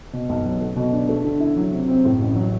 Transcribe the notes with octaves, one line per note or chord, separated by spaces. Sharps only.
B2
B1
F#3
A3
B2
D4
A3
D3
E4
F#3
C3
C4
A2
A1
F#3